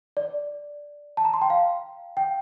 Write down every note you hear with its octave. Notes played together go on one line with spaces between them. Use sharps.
D5
A5
A#5
C6
G5
F5
G5